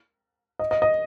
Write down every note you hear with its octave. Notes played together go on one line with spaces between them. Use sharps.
D#5
D#5
D#5